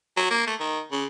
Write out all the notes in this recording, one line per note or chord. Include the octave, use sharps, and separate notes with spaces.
F#3
A#3
A3
D#3
C#3